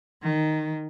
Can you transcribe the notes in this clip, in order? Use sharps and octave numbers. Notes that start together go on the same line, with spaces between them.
D#3